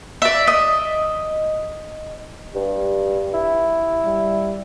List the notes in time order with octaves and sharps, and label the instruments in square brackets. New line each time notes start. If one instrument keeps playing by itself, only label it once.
[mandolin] D5 E5
D#5
[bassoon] G2 [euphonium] G4
[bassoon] E4
[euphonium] G3